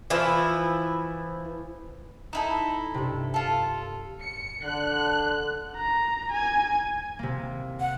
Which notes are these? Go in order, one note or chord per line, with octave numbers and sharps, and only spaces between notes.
E3 F3 E4
D#4 E4 A4 E7
G2 C3
F4 A4
C#7
D3 F#6
A#5
G#5
C3 A#3
F#5